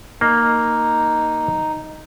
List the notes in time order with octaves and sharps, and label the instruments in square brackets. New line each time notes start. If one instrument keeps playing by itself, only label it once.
[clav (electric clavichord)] A#3 [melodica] D#4